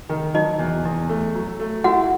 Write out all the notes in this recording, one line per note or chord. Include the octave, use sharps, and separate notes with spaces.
D#3
F#3 D#4 D#5
E2
E2
A3
F#3
A3
E4 F#4 F#5